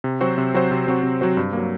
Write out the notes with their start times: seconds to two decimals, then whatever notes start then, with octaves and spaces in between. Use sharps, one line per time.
0.04 C3
0.21 F#3 C4 F#4 C5
0.38 C3
0.54 F#3 C4 F#4 C5
0.71 C3
0.87 F#3 C4 F#4 C5
1.03 C3
1.21 F#3 C4 F#4 C5
1.37 G2
1.53 F#3 A#3